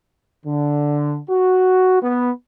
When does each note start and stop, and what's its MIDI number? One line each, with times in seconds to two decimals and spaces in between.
0.46 1.20 50
1.30 1.99 66
2.02 2.31 59